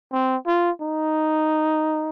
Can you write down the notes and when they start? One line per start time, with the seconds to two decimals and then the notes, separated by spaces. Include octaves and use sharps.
0.13 C4
0.47 F4
0.81 D#4